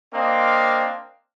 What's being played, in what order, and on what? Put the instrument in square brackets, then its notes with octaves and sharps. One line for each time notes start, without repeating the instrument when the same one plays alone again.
[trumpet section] A#3 C4 D4 D#5 F5